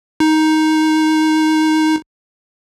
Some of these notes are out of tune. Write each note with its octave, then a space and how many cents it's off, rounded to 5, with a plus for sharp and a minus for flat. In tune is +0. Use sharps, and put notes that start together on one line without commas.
D#4 +10